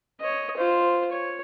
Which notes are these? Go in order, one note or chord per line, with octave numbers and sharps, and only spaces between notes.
C#5 D#5
F4 C5
C#5